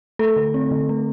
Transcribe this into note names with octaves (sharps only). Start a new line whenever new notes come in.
A3 A4
D3
C4
D3
A3